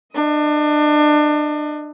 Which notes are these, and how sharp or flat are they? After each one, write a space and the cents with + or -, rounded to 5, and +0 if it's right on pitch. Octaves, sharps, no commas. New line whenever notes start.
D4 +30 D#5 +15